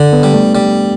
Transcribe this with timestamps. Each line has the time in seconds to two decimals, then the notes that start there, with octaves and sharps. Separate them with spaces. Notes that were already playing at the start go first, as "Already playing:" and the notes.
Already playing: D3 D4
0.13 B3
0.23 G3
0.34 A3
0.55 G3